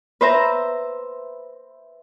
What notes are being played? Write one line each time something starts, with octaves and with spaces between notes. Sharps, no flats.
B4 C5 E5 A#5